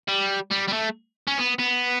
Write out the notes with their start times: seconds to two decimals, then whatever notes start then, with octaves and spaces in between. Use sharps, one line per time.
0.08 G3
0.51 G3
0.68 G3
0.73 A3
1.27 C#4
1.38 B3
1.59 B3